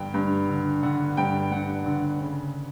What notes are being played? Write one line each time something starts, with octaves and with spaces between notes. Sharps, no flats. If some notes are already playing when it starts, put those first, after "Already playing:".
Already playing: G2 D3 G5
G2
D3
D3 F#5
G2 G5
G2 F#5
D3
C#3